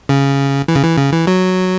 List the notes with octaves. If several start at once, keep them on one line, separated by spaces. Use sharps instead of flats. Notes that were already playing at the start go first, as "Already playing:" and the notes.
C#3
E3
C#3
E3
C#3
E3
F#3